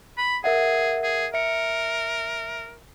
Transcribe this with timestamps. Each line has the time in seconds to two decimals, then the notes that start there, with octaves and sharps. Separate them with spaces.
0.18 B5
0.44 G#4 A#4 E5 F#5
1.04 G#4
1.34 A#4 E5 C#7